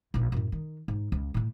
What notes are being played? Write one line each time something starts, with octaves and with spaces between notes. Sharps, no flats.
A#1 F4
F#2 A2
D#3
G#2
C#2
A2 A3